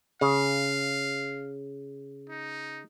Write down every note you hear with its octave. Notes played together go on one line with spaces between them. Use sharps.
C#3 F5
D#4